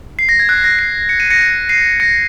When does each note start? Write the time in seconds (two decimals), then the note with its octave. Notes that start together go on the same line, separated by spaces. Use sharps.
0.19 C7
0.29 A#6
0.39 G#6
0.49 F#6
0.64 A#6
0.79 C7
1.09 C#7
1.20 D#7
1.31 A#6 C#7
1.69 C7 D#7
2.00 A#6 C#7